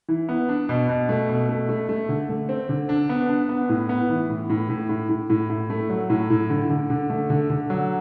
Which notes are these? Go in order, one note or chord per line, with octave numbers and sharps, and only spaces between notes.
E3
B3
D4
B2
B2
A3
B2
A3
A3
A3
D3
A3
C4
D3
D4
B3
D4
B3
A2
B3
E3
A2
A2
A2
A2
A2
A2
A2
A3
F#3
A2
A2
D3
D3
D3
A3
D3
D3
F#3